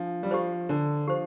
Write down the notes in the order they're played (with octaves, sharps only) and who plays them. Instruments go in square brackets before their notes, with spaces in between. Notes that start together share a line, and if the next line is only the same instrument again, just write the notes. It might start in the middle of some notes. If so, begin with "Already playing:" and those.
Already playing: [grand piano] F3 [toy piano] D4
[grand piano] G3
[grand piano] F3 [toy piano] G4 C5
[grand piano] D3 [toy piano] D4
[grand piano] F3 [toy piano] G4 C5